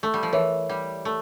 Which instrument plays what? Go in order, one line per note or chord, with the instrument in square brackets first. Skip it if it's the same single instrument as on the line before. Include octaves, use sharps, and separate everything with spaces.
[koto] A3
G3
F3
[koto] E3 [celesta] A#4 C#5 E5
[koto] G3
A3